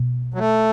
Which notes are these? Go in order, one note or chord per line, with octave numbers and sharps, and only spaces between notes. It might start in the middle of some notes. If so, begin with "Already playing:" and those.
Already playing: B2
F#3
A3